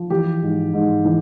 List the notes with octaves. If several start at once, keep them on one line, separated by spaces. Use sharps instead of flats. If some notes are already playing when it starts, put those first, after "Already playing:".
Already playing: F3
E3 G4
G#2
G#2
E3